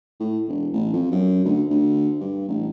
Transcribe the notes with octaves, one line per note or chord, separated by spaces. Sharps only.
A2
E1
A1
F2
F#2
D2
D2
G2
A1